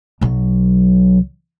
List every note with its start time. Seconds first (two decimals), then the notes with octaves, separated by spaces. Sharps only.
0.21 B1 F#3